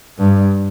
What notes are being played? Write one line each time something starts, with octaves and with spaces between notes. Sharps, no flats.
G2